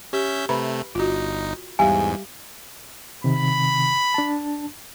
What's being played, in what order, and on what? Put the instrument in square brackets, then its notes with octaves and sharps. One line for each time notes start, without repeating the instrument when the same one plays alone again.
[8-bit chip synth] C#4 E5 G6 [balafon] G4
[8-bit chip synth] C3 A3 [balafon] B4 A#5 B5
[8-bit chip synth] G1 D#4 [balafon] F4 F#4
[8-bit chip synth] E2 G#2 [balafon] G3 G4 F5 [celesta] G#5
[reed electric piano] C3 D#3 [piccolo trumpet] B5
[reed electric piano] D4 A5